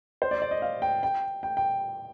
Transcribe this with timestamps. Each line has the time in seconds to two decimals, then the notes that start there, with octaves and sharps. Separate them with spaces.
0.22 C5
0.31 D5
0.42 D5
0.51 D#5
0.62 F5
0.82 G5
1.03 G5
1.43 G5
1.57 G5